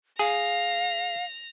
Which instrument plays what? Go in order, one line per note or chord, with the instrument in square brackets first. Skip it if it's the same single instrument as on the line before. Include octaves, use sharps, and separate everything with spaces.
[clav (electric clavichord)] G#4 [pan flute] F5 [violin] A#6 F7